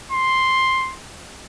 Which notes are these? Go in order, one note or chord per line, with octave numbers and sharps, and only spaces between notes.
C6